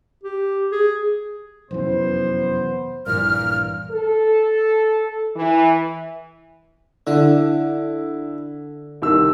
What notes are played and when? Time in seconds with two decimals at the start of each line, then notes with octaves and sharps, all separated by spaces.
0.24 G4
0.72 G#4
1.71 F1 F#2 E3 B3 C5
3.06 A#1 G2 A#2 E3 F6
3.91 A4
5.35 E3
7.07 D3 E4
9.02 C2 D#3 E6